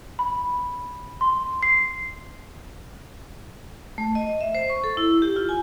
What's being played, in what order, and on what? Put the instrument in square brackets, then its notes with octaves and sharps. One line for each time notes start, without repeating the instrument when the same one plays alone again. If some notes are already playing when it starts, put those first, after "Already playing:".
[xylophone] B5
C6
C7
[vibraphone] A3
D#5
E5
C5
C#6
A4
E4
G4
F4
G#5